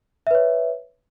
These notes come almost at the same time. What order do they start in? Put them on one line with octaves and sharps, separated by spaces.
E5 B4 C#5